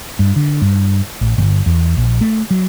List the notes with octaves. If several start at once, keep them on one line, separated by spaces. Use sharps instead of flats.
G2
D3
G2
A1
G1
E2
A#1
A3
F#3